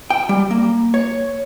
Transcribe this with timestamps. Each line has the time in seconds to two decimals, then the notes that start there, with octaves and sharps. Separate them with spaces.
0.10 G5
0.29 G3
0.51 A#3
0.94 C#5